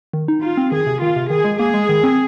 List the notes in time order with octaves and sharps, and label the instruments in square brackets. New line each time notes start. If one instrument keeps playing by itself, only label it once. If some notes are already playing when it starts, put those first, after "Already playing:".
[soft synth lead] D#3
D#4
[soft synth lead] D#4 [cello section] F4
[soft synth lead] C4
[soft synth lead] D#3 [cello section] G#4
[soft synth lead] C3
[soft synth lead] D#3 [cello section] F4
[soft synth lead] C3
[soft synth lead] D#3 [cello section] G#4
[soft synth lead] G#3
[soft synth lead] A#3 [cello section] G#4
[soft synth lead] G#3
D#3
C4